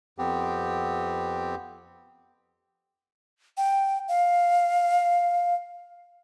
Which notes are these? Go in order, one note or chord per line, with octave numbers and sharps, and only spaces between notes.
F2 B3 C4 G4
G5
F5